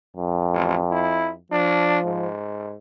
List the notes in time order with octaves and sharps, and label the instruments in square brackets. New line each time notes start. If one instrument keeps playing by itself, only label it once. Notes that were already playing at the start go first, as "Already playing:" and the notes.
[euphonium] F2
[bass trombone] A1
E4
[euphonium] F3 [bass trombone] D4
[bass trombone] G#2